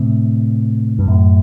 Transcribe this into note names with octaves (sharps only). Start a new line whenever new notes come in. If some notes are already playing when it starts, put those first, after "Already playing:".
Already playing: A2 C3
G2
F#2 A2